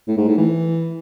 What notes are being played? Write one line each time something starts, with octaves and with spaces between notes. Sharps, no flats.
A2
G#2
A2
E3